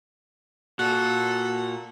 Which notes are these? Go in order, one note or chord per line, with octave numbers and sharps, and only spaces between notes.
A#2 F#4 A4 F#6